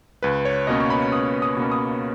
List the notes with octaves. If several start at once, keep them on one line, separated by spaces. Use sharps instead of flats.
C#2 B4
C#5
B2 A#3 C#4 D#5
C#6
B5
C#2 D#6
D#6
B2 A#3 C#4
D#6